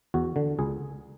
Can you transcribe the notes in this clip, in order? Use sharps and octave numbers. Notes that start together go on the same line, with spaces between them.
E2 F#4
D3
C#2 G#4